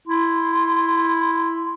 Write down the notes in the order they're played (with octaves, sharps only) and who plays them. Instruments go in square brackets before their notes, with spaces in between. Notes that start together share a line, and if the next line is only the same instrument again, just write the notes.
[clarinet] E4 [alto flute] C6